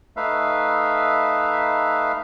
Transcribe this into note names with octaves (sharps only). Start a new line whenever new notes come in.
A3 D#4 B4 E5 F5